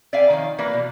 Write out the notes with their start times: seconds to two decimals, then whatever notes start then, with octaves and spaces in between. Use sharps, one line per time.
0.13 D5 E5 F5 G5 G#5
0.30 D#3 F3 C#5 F5
0.58 E3 A#3 B4 D5
0.73 B2